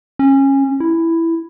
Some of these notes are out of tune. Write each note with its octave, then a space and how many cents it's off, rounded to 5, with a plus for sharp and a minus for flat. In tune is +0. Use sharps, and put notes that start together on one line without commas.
C#4 -20
E4 +5